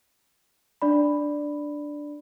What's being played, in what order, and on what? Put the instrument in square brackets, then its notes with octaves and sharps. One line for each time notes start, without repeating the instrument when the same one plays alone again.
[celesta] D4 D5 B5